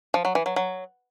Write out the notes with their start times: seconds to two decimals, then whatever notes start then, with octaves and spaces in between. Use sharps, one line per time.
0.14 F3
0.25 F#3
0.35 E3
0.46 F#3
0.56 F#3